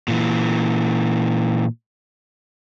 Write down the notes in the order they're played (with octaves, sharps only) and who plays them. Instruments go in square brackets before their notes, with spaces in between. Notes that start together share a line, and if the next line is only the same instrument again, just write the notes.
[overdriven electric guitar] A#2 E3